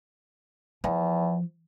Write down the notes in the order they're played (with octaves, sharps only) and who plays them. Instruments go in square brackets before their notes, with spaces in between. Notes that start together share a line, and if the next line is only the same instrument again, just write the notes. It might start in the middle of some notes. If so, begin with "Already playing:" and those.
[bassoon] E2 [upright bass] F3